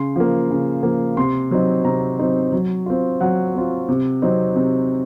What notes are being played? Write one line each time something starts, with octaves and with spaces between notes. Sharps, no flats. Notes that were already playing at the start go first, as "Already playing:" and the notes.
Already playing: C#3 C6
F3 A#3
C#3
F3 A#3
C3 C6
F#3 C4 D#4
C3 A#5
F#3 C4 D#4
F#3
C4 F4
F#3 F#5
C4 F4
C3
F#3 C4 D#4
C3